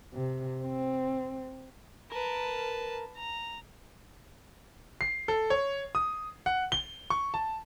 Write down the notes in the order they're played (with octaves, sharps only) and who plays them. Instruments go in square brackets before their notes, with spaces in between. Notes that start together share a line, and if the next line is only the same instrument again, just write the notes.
[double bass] C3
C4
[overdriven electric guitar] A#4 [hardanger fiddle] B4 A5
[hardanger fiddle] A#5
[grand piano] C7
A4
C#5
D#6
F#5
G7
C#6
A5